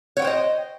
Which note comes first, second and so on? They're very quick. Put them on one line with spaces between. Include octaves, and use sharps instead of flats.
C#5 F#5 G5 C5 D#5